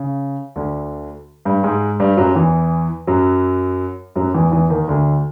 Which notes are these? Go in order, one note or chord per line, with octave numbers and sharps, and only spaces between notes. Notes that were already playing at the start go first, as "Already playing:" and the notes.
Already playing: C#3
D2 D3
G2 G3
G#2 G#3
G2 G3
F#2 F#3
E2 E3
F#2 F#3
F#2 F#3
E2 E3
E2 E3
D#2 D#3
D2 D3